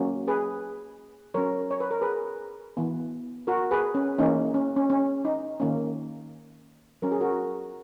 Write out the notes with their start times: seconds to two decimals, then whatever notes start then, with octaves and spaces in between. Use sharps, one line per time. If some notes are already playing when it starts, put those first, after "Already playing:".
Already playing: F#3 A#3 C#4
0.28 G#4 B4
1.34 F#3 C#4 A#4 C#5
1.71 C#5
1.80 B4
1.91 A#4
2.01 G#4 B4
2.77 E3 B3
3.47 F#4 A#4
3.71 G#4 B4
3.95 C#4
4.18 E3 A#3 C#4 D#4
4.54 C#4
4.76 C#4
4.90 C#4
5.25 D#4
5.60 D#3 A#3 C#4
7.02 F#3 C#4 A#4
7.12 G#4
7.20 F#4 A#4